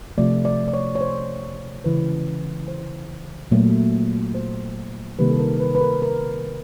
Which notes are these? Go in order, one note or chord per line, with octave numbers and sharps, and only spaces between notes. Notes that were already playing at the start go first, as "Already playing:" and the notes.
C3 F3 A3 D5
D5
D5
C#5
C#5
C5
C#3 E3 G#3 B4
C5
A#2 F#3 A3
C5
C3 D#3 G3 A#3 B4
A4
A#4
B4
B4
A#4
A#4